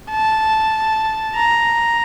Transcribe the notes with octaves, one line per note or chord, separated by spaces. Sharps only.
A5
A#5